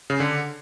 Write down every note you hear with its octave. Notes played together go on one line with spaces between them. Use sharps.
C#3
D3